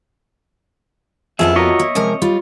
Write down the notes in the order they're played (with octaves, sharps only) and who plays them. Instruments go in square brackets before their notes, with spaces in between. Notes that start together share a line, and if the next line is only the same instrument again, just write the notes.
[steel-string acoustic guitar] F2 B3 A5 [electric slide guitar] F4 G#4 E5
[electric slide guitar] F4 F#4 A#4 [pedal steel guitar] C#5 D#5 E5
[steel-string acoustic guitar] A#3
[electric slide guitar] C3 [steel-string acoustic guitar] F3 G#3 A#4
[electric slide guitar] G3 [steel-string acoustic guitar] F4